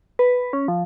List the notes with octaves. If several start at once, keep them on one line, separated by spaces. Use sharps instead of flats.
B4
C#4
F3